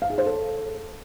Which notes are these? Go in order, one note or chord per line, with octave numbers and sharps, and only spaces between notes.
F5
G#4
C5
A4